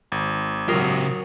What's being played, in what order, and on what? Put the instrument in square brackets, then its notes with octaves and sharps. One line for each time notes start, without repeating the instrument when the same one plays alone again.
[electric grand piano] G#1
[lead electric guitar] C#3 G4 [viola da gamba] F#3 [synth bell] F4 A#4 D#6